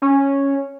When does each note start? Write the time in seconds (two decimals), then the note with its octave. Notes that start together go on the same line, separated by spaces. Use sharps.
0.02 C#4